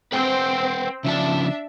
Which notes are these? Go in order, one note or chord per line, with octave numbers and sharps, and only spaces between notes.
C4 B4 F#5 G5
C#3 F3 D4 E5 A5